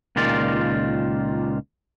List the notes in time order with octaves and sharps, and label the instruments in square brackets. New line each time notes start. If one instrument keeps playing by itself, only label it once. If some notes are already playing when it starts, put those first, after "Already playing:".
[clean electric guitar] C#2 A#2 D#3 F4 D5